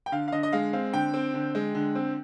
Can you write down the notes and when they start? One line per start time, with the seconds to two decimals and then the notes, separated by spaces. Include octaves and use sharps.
0.06 G5
0.12 D3 F5
0.28 F5
0.32 D3 D#5
0.43 D#5
0.52 G#3 F5
0.73 C4 F5
0.93 D3 G5
1.14 C4
1.34 D3
1.55 G#3
1.75 D3
1.95 C4